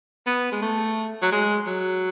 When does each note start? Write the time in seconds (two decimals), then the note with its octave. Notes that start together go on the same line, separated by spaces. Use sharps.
0.27 B3
0.52 G#3
0.62 A3
1.22 F#3
1.32 G#3
1.66 F#3